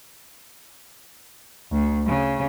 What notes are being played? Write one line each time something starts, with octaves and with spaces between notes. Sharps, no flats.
D2
C#3